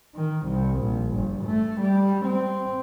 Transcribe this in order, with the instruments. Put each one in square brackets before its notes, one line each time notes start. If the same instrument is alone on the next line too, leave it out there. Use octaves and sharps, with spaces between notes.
[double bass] D#3
C2
A#1
G1
A3
G3
C4